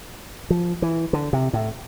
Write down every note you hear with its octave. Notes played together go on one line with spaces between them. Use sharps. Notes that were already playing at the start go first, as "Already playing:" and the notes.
F3
E3
D3
C3
A2